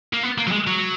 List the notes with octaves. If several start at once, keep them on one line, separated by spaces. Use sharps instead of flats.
A#3
B3
A#3
F#3
G#3
F#3